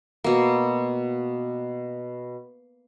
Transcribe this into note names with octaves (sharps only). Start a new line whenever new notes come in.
B2 A#3